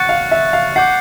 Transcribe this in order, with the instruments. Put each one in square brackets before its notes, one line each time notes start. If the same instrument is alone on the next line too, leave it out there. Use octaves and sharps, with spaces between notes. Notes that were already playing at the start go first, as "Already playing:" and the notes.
Already playing: [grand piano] F#5 [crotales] C#6 F#6 A6 C#7
[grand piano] F5
E5
F5
[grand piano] F#5 [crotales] D6 G6 C7